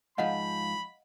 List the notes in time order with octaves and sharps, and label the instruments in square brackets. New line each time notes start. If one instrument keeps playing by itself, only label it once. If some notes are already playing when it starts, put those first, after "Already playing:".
[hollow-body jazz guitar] G#2 F3 [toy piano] D#5 F5 F#5 [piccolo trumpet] B5